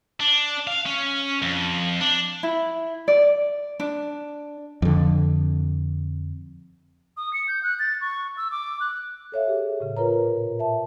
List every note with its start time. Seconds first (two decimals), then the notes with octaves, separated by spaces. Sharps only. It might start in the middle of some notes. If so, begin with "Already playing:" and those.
0.20 D4
0.67 F5
0.86 C#4
1.42 F2
2.00 D4
2.43 E4
3.08 D5
3.80 D4
4.82 F2 D3
7.17 D#6
7.33 C#7
7.48 G6
7.63 F#6
7.79 A6
8.01 C#6
8.37 E6
8.51 D6
8.80 F#6
9.32 A4 C#5 E5 F5
9.47 G4 G#4
9.80 A2 C#3
9.97 F4 A#4 B4 C#5 A#5
10.24 A#2
10.59 E5 A5